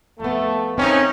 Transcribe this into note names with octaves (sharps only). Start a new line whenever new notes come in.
F2 A3 B3
E3 A#3 C4 C#4 D#4